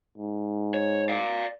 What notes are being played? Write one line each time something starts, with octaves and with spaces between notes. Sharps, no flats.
G#2
C#5
D5 F5